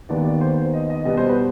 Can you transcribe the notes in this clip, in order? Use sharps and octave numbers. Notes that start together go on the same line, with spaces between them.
D#2 D#3 B3 D5
D5
C5
C5
D#5
D#5
B2 G3 B3 D#5
C5
B4